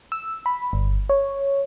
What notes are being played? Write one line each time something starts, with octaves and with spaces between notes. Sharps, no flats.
E6
B5
G1
C#5